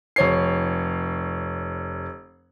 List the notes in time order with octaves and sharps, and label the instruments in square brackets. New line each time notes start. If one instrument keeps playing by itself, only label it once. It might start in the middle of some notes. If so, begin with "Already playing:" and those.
[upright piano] F1 C#5 C7